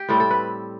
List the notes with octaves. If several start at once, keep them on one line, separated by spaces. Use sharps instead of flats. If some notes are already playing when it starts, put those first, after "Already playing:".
Already playing: G4
A2 G3 C4 A4
A4
B4